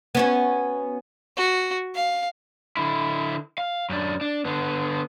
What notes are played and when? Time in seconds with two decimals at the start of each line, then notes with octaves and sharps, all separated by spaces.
0.15 B3 C#4 F#4
1.37 F#4
1.95 F5
2.77 D3 E4
3.58 F5
3.90 F#2 D4
4.21 D4
4.45 D3 B3